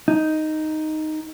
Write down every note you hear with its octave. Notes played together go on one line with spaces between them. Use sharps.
D#4